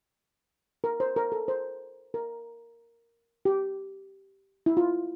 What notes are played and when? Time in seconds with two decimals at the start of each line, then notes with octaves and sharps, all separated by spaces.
0.84 A#4
1.00 C5
1.16 A#4
1.32 A4
1.48 C5
2.14 A#4
3.45 G4
4.66 E4
4.77 F4